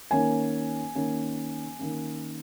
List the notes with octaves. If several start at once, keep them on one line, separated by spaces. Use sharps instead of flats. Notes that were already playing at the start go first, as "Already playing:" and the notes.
D#3 A#3 C#4 G#5
D#3 A#3 C#4
D#3 A#3 C#4